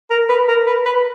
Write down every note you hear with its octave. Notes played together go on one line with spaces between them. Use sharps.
A#4
B4
A#4
B4
B4